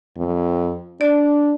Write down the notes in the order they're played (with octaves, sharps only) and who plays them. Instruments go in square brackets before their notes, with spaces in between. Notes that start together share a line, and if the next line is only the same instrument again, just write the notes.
[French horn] F2
[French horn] D4 [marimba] D5